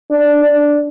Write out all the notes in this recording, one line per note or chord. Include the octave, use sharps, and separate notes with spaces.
D4
D4